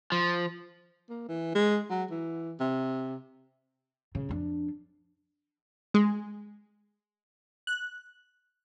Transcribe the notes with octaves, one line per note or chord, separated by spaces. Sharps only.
F3
A#3
E3
G#3
F#3
E3
C3
C#3
F2 D4
G#3
F#6